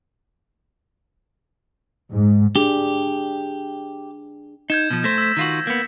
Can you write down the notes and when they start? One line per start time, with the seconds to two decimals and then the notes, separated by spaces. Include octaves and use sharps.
2.11 G#2
2.56 D4 G4 G#4
4.70 D#4 G6 G#6 E7
4.90 B2 F3
5.04 A3 C5 A#6 B6
5.18 E6 B6
5.37 D#3 F4 F#4
5.67 A#3 B3